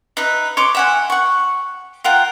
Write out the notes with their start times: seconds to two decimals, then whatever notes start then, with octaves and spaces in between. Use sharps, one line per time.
0.17 D#4 B4 E5
0.57 C#5 C6 D6
0.75 E5 F#5 G#5
1.10 F#5 C#6
2.04 F4 A#4 F#5 G5